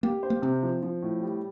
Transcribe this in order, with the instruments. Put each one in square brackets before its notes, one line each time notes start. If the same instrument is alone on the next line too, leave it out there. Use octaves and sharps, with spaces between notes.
[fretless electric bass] A#3 [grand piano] G4
[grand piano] C5
[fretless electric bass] A#3
[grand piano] C3 [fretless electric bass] C4
[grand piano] F3
F3
A2
G3